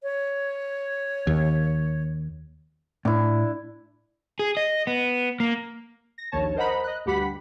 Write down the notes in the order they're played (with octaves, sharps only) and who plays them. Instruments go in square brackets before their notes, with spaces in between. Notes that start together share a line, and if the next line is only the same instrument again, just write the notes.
[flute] C#5
[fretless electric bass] D#2
[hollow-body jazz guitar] A2 [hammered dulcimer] D4 E4
[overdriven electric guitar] G#4
D#5
B3
A#3
[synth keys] A#6
A#1 D#2 C#5 A5
A#4 C5 D#5 F#5 A#5 B5
D#5 F#6
D2 G2 G4 F#5 B5 B6